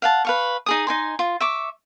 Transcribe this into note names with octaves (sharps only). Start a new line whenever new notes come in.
F5 F#5 A5
B4 F5 C#6
D#4 G#4 D#6
D#4 G#5 C6
F4
E5 C#6 D6